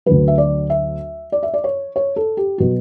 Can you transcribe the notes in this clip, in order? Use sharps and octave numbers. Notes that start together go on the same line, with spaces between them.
D2 D3 F#3 B4
E5
D5
E5
D5
E5
D5
C#5
C#5
A4
G4
B2 F#3 F#4